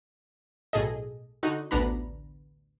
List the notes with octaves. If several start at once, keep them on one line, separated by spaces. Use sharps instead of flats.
B1 A2 G#4 A4 D#5
D3 D#4 F#4
A1 D2 B3 D4 A#5 B5